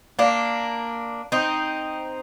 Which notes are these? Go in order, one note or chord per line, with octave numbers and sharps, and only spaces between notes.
A#3 D4
C4 D#4